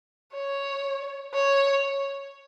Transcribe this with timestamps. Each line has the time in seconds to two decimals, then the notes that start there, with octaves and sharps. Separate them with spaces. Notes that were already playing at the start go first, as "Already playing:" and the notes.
0.34 C#5
1.33 C#5